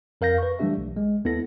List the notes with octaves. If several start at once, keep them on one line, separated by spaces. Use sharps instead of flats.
F2 A#4 F5 G6 A#6
B4 C#6
E3 G3 A3 D4 G4 E5
B1
G#3
D#2 B3 E4 A4 A#6